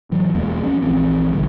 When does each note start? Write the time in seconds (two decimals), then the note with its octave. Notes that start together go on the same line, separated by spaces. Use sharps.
0.11 A2 E3 F#3
0.34 E1 E2 G#3 A#3
0.61 F3 B3 C#4
0.82 A#1 F2 E3 C4
1.33 A#1 D3 G3